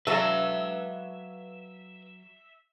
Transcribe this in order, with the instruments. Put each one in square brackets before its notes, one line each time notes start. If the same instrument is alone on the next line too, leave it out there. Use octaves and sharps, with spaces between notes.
[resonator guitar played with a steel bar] F#3 A4 [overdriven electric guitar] B4 F5 [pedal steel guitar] E5